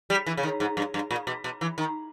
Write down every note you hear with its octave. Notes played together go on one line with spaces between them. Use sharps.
G3
E3
C#3
D#3
G#2
G2
G2
A#2
B2
B2
E3
D#3